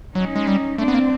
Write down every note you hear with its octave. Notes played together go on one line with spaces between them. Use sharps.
F#3 C#4 D#4
G#3
G3
A3 C4 D4
B3
A#3